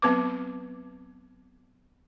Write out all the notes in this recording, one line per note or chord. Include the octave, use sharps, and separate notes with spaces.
F#3 B3 C4 B4 D6